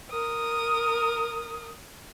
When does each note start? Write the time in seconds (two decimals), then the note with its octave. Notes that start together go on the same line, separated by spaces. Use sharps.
0.10 A#4 D#6